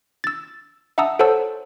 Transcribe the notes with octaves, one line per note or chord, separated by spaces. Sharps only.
E6 A6
E5 F#5 A5 A#5 D#6 E6
A4 C5 C#5 F#5 A5 E6